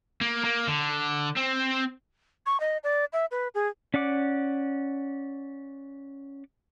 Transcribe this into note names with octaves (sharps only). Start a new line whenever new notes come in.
A#3
A#3
D3
C4
C#6
D#5
D5
E5
B4
G#4
C#4 D5 F#5 D6